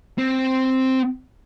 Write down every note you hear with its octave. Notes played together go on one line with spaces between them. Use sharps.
C4